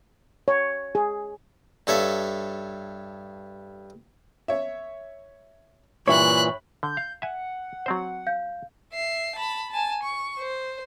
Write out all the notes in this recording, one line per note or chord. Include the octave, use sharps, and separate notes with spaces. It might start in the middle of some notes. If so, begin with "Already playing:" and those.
C#5
G#4
G2 A4 C#5 E5 F5
C#5 E5
G2 A#2 E3 G3 C#5 E5 B5 F#6
D3 G6
F5
E5 F#5 G#5
F#3 C4 C5
F5 G6
E5 C7
A5 B5
G#5 A5
C#6
C5